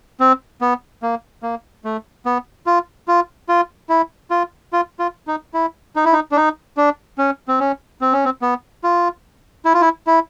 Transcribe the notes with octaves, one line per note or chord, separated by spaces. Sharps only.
C4
B3
A#3
A#3
A3
B3
F4
F4
F4
E4
F4
F4
F4
D#4
E4
D#4
E4
D#4
D4
D#4
D4
C#4
C4
C#4
C4
C#4
C4
B3
F4
E4
F4
E4
E4